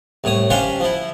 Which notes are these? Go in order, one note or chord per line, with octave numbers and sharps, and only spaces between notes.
C2 A2 C#5 D#6
C#4 D4 G4 C5 C#5 F5
F3 E4